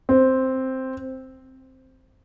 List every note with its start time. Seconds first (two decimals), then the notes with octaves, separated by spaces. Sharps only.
0.09 C4